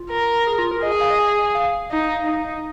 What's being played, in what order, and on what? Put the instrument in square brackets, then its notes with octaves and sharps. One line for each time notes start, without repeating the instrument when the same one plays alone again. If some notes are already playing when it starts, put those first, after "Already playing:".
Already playing: [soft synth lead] F4
[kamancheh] A#4
[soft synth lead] G#4
F4
A#4
[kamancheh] G#4 [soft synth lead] D#5
[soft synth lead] G#5
F5
D#5
G#5
F5
[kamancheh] D#4
D#4